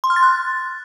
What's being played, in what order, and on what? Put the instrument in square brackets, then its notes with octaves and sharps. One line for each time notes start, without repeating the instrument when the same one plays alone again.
[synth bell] C6
F6
A6
F#6